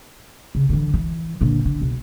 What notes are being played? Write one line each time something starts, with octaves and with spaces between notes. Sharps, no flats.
C#3
D3 E3
E3
A#2 D3
D3
B1